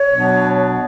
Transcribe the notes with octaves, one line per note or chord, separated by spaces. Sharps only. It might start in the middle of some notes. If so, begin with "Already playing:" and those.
Already playing: C#5
B2 F#3 B3 D4